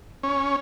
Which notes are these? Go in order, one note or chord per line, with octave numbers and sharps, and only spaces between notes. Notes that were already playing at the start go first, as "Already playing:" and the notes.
C#4